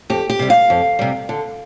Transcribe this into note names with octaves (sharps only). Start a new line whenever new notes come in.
F2 G4
G4
C3 G3
F5
F2
C3 G3
D3